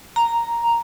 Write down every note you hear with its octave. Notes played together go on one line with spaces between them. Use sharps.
A#5